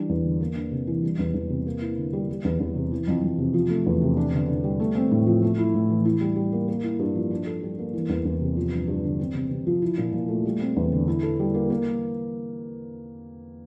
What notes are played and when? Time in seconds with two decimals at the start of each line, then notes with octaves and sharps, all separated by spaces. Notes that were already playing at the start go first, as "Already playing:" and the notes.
Already playing: E3 G3 D4
0.09 E2
0.25 D3
0.40 A#3
0.55 D4
0.71 C3
0.87 E3
1.03 G3
1.19 E2
1.34 E2
1.50 C3
1.66 A#3
1.82 E4
1.98 D3
2.13 G3
2.29 G3
2.44 E2
2.60 E2
2.75 C3
2.92 E3
3.08 F2
3.23 F2
3.38 C3
3.54 F3
3.70 A3
3.86 E2
4.01 C3
4.17 D4
4.33 D3
4.48 D3
4.64 G3
4.80 A3
4.95 C4
5.11 A2
5.26 F3
5.42 A3
5.58 E4
5.74 A2
5.89 E3
6.05 E4
6.21 G3
6.36 G3
6.52 A#3
6.68 A#3
6.84 E4
6.99 G2
7.15 F3
7.31 D4
7.46 A4
7.63 G3
7.78 A#3
7.93 E3
8.09 E2
8.25 E2
8.41 C3
8.57 F3
8.72 G2
8.88 G2
9.04 D3
9.19 C4
9.35 C3
9.51 C3
9.67 F3
9.82 E4
9.98 A#2
10.13 A#2
10.28 A3
10.45 G3
10.60 C4
10.76 E2
10.92 D3
11.08 E4
11.23 A4
11.39 G3
11.54 A#3
11.70 A#3